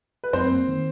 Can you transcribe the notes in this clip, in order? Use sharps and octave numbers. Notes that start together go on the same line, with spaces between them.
B4
F#2 C4 C5
A#3
D#3